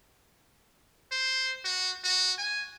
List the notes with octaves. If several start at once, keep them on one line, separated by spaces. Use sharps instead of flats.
C5
F#4
F#4
G#5